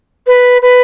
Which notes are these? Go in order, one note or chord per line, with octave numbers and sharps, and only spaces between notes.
B4
B4